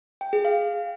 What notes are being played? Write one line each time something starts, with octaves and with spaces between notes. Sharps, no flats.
G5
G#4
F5